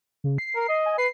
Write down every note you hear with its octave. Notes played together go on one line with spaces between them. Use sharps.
C#3
C7
A#4
D#5
G#5
B4 C7